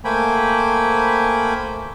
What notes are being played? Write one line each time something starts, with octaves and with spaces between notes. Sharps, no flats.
A3 A#3 C5 G5 G#5 B5